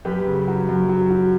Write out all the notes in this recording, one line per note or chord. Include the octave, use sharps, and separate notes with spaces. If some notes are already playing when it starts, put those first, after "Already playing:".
F#2 G4 B4
C#3
F#3
F#2
F#3
F#3